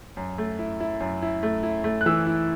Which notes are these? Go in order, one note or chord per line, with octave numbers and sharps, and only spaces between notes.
F#2
A3
E4
E4
F#2
E4
A3
E4
A3
F#6
E3 E6
E4